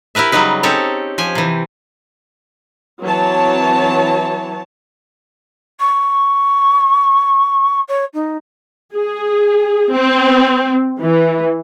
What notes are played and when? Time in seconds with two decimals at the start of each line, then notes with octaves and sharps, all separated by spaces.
0.15 E4 G4 A#4 B4 E5
0.32 C#3 F#3 G3 D#4 B4
0.63 C4 C#4 D#4 G4 A4 C#5
1.18 F3 G4 G#5
1.35 C3 E3
3.03 E3 F#3 C4 C#5 A5
5.80 C#6
7.88 C#5
8.13 D#4
8.96 G#4
9.92 C4
11.01 E3